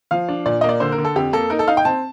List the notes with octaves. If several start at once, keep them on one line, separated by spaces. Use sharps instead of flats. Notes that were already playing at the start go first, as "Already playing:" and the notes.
F3 F5
D4
A#2 D5
A#3 D#5
D5
D3 C5
A#4
D3
A4
F2 G4
A#3 A4
D#4 A#4
A4
D#4 F5
G5
C4 A5